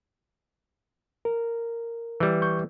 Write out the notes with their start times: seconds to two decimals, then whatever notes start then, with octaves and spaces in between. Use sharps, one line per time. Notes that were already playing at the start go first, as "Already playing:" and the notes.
1.25 A#4
2.20 E3 G3
2.42 C#6 G6